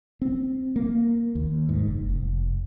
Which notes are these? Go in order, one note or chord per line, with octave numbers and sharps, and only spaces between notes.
C4
A#3
D#2
G#2
F#1
F1